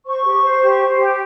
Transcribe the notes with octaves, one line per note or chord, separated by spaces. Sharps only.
C5 C#6
G4
C5
G4
C5
G4